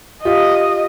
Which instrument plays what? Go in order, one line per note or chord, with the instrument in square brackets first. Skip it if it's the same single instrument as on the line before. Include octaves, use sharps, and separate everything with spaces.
[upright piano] F4 G4 [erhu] D#5